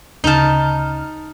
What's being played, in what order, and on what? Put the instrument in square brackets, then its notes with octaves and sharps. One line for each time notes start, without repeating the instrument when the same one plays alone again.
[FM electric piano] D2 C#3 F6 [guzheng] D#4 A5